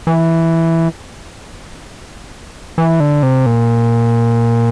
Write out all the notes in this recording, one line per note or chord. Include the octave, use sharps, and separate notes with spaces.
E3
E3
D3
C3
A#2